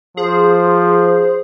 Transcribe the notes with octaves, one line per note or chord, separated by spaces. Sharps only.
F3 G#4 C5